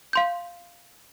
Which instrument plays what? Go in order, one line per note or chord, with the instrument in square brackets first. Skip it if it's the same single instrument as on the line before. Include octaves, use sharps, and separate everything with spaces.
[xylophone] F5 C6 G6